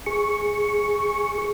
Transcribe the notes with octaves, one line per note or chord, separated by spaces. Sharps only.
G#4 C#6